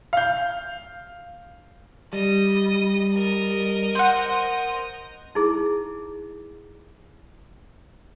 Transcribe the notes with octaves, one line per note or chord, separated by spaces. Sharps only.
F5 G6
G3 D#5
A#4 D#5
C5 F#5
D#4 E4 G#4